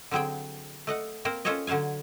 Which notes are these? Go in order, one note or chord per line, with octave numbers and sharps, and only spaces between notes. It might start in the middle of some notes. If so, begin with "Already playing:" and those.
D3 F#3 C4 G#4 G5
A3 D#5 F#5
A#3 C4 A#4 C5
C#4 F4 A4 C5 C#5 D#5
D3 F#3 C5 F5 G#5